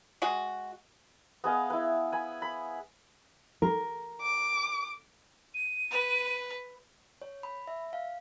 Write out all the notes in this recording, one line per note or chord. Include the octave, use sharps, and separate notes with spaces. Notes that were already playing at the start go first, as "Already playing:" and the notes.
G#3 F#4
B3 G#4 D#5 F5
E4 B4
G#5 B5
B5
A#4
D6
D#7
B4
C#5
B5
E5
F5